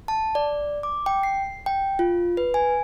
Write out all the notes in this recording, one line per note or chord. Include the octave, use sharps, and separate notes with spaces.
A5
D5
D6
G5
C7
G5
F4
B4
G#5